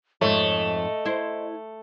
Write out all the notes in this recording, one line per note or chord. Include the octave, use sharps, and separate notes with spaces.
F2 G#2 A3 C#5 D#5
E4 C5